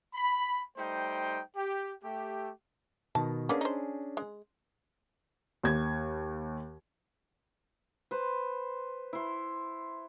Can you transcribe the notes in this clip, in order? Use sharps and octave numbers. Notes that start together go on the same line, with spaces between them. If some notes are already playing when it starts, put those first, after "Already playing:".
B5
G3 A3 D#4 C5 G5
G4
A3 G4
B2 D#3 A5
A#3 B3 C#4 D4 G#4
D#4 C5
G#3
D#2 G#6
B4 C5
E4 C6